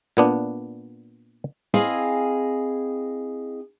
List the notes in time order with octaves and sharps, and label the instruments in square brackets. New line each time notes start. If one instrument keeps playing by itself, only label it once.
[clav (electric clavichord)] A#2 B3 D4
[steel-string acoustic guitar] C4 E4 G#4 D#5 F5 G#5